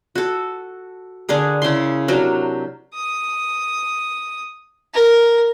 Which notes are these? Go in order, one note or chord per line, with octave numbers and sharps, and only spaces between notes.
F#4 A4
D3 D4 G#4 A#4
C#3 E4 C6
C3 F#3 D4 A#4
D#6
A#4